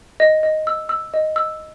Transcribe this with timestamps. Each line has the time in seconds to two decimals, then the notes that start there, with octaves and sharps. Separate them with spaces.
0.20 D#5
0.43 D#5
0.67 E6
0.89 E6
1.14 D#5
1.36 E6